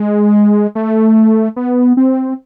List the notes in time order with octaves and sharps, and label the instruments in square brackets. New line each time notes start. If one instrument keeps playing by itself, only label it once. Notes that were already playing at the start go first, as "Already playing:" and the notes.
Already playing: [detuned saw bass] G#3
A3
B3
C4